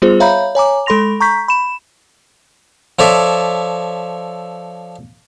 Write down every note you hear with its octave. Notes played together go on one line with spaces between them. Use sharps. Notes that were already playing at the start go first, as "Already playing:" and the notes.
G3 B3 F4 G#4 C5
C#5 E5 F5 A#5 B5 G6
C#5 G#5 A#5 D6
G#3 A4 B5 C6 A#6 F7
A#5 C#6 G6 B6
B5 E7
F3 A4 C#5 D5 E5